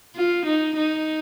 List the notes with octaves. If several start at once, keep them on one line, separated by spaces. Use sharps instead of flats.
F4
D#4
D#4